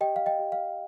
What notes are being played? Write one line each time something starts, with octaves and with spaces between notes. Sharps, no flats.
G4 D#5 G5
F5
D#5 G5
G4
F5